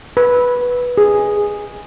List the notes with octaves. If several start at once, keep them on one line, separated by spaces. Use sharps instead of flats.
B4
G#4